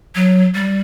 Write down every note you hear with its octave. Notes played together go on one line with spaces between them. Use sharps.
F#3
G3